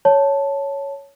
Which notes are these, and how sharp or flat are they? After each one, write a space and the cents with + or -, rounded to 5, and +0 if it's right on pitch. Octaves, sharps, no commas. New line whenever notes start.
C#5 +5 A5 +0